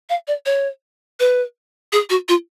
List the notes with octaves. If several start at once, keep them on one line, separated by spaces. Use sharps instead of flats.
F5
D5
C#5
B4
G#4
F#4
F4